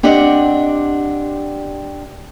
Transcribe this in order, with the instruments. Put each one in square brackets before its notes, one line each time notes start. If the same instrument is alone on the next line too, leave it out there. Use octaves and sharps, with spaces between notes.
[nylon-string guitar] C4 D4 G4 D#5 F#5